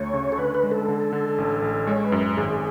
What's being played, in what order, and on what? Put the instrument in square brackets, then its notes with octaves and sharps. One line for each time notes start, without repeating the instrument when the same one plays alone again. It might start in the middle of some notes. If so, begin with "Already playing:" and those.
Already playing: [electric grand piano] D2 A3 [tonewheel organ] C#5
[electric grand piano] C#3
[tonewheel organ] A4
[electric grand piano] D3 [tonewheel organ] B4
[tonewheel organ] B4
[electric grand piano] G#3
[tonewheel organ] A4
[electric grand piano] D3
D3
A1
A1
[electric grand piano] G#3 [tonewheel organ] C#5
[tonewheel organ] B4
[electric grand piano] F#2
[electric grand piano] G#1 [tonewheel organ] G#4